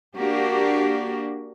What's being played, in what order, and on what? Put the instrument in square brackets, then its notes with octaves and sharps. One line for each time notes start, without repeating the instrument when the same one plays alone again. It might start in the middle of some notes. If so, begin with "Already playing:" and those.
[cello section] A#3 D4 F#4 G4